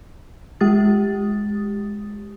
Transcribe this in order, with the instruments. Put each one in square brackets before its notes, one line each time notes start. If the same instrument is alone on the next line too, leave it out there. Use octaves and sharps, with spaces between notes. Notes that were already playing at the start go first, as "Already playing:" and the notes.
[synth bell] G#3 G4 D#6 A6